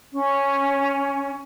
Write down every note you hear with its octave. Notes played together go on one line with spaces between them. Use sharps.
C#4